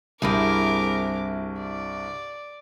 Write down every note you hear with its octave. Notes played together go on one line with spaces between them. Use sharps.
C2 G2 C4 E4 G#4 A#4 D6
D5